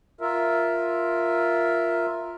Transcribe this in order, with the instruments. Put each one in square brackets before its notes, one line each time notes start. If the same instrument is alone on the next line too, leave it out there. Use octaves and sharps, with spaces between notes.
[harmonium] F4 A#4 E5